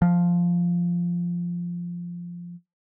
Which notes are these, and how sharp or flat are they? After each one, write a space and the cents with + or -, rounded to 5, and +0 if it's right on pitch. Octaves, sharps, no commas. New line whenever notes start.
F3 -5